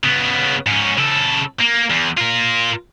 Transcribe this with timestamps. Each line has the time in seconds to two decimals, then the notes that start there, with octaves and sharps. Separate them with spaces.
0.04 C#3 B3
0.66 G#2 C#4
0.98 C#3 A4
1.61 A#3
1.90 E2
2.18 F4 A#4